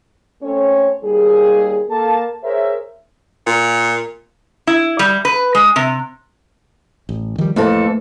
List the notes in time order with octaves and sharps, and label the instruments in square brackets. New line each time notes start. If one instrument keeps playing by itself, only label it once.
[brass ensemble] A3 C4 C#4 A4 C#5
D#2 G3 G#4
A#3 A4 A5
G#4 A#4 C5 C#5 E5
[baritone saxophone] A#2
[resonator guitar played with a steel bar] E4
G3
B4
G#3
C3
[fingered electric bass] A1
D#3 F3 G3
[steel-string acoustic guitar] F2 E3 A4 [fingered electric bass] A3 A#3